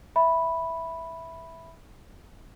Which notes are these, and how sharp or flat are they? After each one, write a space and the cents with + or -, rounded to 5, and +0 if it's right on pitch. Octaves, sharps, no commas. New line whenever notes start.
E5 +0 B5 +0